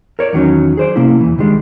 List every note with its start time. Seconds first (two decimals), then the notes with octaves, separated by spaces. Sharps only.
0.19 A#4 C#5 D5
0.33 E2 D#3 F#3 C#4 D#4
0.77 G#4 C5 D5
0.96 C3 A#3 C#4 E4
1.21 E2 E3
1.38 C#2 D#3 G3 G#3 D4